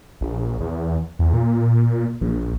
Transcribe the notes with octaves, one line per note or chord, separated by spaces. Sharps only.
A#1
E2
E2
A#2
A#1